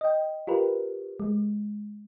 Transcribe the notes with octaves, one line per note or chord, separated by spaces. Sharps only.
D#5 G5
F4 G4 A#4 B4
G#3